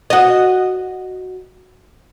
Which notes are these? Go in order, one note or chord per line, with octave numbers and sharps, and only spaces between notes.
F#4 D#5